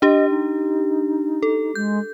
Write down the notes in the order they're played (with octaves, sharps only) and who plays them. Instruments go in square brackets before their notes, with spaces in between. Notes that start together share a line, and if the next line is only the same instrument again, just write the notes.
[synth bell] D4 G4 [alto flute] D#5
[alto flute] D#4
[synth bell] A4
[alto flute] G#3 [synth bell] G6